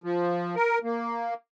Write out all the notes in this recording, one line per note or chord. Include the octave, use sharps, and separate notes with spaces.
F3
A#4
A#3